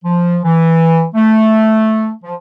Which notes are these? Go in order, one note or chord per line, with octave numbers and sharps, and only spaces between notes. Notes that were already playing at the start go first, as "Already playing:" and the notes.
F3
E3
A3
F3